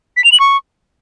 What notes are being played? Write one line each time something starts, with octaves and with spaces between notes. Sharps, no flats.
B6
F7
F#7
C#6